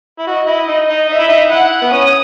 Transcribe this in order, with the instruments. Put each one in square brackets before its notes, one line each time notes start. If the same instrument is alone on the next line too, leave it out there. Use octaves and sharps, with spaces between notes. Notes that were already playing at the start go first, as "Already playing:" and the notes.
[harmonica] E4
[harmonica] F#4 [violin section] D#5
[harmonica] E4
D#4
D#4
[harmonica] D#4 [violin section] E5
[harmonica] E4
D#4
[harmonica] E4 [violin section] F#5
[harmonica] B3
[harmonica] C#4 [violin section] D#6